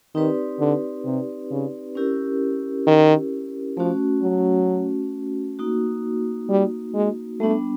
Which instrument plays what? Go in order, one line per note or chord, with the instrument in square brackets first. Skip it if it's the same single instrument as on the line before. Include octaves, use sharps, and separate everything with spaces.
[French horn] D#3 [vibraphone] C4 D#4 G4 B4 D5
[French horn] D3
C3
C#3
[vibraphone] C#4 E4 G4 A#4
[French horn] D#3
[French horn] F3 [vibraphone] A3 C#4 F#4
[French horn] F#3
[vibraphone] A#3 D#4 F#4
[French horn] G3
G#3
[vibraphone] G3 B3 D4 [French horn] A3